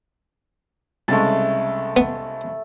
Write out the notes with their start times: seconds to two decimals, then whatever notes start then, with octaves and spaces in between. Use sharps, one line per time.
1.08 C2 C#3 G#3 A3 A5
1.97 B3